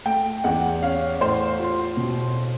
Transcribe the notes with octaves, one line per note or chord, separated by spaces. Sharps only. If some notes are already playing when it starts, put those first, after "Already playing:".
A3 G5
E2 F#5
C#4 F5
A2 C5
F4
B2